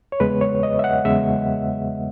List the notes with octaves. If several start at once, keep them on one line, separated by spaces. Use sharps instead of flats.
C#5
E2 C#3 G#3 B3 B4
C#5
D#5
E5
F#5
E2 C#3 G#3 B3 E5